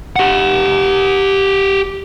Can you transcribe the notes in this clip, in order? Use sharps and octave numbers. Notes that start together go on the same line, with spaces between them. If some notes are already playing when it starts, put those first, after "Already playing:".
G4 F#5